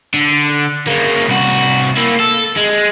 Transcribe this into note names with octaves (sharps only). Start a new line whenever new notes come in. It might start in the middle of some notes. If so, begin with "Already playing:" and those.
D3
C#3 A#3
C2 F#4
A#3 E4
A4
G#3